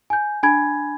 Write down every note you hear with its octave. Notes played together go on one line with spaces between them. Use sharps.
G#5 G6
D4 G#5 B5 G#6